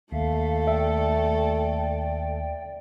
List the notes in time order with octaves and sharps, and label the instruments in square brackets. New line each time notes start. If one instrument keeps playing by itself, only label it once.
[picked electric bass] D#2 [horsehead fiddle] A3 A4 [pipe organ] E5 F5
[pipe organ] D5 G5 [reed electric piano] E5